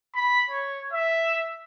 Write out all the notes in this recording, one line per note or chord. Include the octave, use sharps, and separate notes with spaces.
B5
C#5
E5